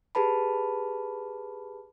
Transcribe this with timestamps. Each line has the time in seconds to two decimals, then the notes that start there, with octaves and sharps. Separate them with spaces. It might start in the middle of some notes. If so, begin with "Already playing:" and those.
0.15 G4 G#4 B4 A5 B5